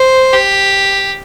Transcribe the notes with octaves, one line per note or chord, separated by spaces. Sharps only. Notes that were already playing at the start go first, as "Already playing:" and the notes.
Already playing: C5
G4